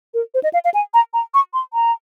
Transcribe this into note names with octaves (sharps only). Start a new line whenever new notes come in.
A#4
C5
D#5
F5
F5
G#5
A#5
A#5
C#6
C6
A#5